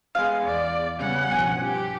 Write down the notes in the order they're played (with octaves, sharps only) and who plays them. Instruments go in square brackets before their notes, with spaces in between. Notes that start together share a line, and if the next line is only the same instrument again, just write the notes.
[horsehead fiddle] G#3 B3 [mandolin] F5
[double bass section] E2 [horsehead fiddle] D5
[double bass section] C#3 G3 B3 [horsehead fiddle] C#4 F#5
[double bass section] B1 G2 F3 [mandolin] G#5
[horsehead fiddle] G4